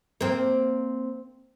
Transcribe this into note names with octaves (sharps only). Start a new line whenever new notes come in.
A#3 C4